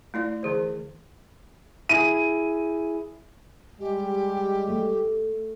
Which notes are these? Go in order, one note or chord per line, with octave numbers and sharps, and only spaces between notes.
A3 E4 D5
D3 E3 G#4 C5
E4 G#4 D#7
G3 G#3 G4
A3